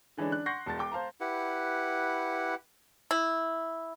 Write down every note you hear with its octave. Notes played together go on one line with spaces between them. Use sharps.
D3 E3 G#3 C#4 D4
D4 F#6
F#5 C6 C#6 G6 A#6 C7
E1 A5 A6
G5 D6
C5 F5 A5 A#5
E4 G4 B4 F#5
E4